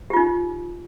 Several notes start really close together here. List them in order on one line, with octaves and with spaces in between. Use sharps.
G4 F4 D#4